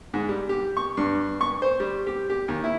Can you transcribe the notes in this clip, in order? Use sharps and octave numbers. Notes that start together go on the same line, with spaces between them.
G#2
G3
G4
C#6
G2
C#6
C5
G3
G4
G4
D#2
E4